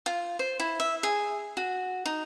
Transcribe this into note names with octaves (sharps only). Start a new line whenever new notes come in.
F4
C5
E4
E5
G#4
F#4
D#4